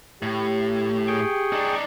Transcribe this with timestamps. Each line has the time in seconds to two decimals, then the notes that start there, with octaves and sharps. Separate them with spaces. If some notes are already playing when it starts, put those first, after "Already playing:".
0.23 A2 G4
1.08 G#4 G5 C#6
1.52 D4 D#4